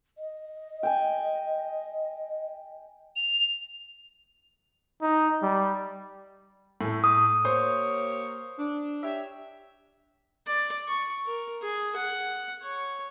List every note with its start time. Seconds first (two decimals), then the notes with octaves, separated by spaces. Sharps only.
0.18 D#5
0.83 G5 G#5
3.16 F7
5.02 D#4
5.43 G3
6.81 A2 A3
7.04 D#6
7.45 A#3 G4 C5 C#5
8.58 D4
9.03 G4 C#5 E5
10.47 D5
10.88 C#6
11.26 A#4
11.62 G#4
11.96 F#5
12.62 C#5